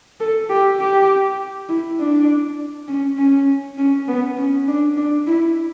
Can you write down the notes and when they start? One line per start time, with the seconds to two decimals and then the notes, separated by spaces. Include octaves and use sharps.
0.20 A4
0.50 G4
0.80 G4
1.69 E4
1.99 D4
2.88 C#4
3.18 C#4
3.78 C#4
4.08 B3
4.37 C#4
4.68 D4
4.97 D4
5.27 E4